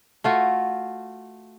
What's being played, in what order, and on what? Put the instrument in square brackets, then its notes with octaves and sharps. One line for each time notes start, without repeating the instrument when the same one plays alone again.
[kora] A3 F4 F#4